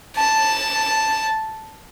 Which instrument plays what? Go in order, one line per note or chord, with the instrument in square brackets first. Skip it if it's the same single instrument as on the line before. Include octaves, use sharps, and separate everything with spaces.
[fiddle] A5